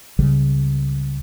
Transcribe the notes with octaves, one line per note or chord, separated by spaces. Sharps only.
C#2 C#3 G3